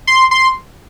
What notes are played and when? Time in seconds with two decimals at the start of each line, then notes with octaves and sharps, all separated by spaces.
0.07 C6
0.31 C6